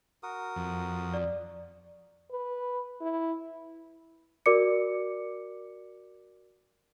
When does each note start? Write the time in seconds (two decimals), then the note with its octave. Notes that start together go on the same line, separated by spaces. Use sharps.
0.23 F#4 A#4 D#6
0.56 F2
1.14 D5
2.31 B4
3.02 E4
4.46 F#4 A#4 D5 D6 C#7